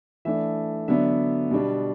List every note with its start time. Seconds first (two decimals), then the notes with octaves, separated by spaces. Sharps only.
0.25 E3 A3 D4 E5
0.88 D3 F#3 B3 D4 E5
1.51 B2 G3 B3 D4